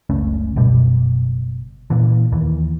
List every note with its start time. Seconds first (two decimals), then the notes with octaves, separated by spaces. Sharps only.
0.10 F#1 C#2 A3 C#4
0.56 F#1 F#2 B2 G3
1.90 A#2 E3
2.32 D#2 E3